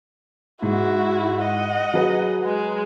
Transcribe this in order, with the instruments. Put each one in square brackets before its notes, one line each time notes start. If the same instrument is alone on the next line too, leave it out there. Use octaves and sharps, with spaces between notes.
[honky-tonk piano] G#2 [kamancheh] E4 F#4
[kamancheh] D#5 F#5
[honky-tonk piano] F#3 G#4 B4
[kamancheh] G#3